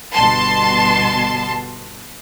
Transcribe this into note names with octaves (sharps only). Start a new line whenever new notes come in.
G1 B2 A5 C6